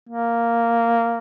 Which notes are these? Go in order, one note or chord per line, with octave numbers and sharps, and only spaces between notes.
A#3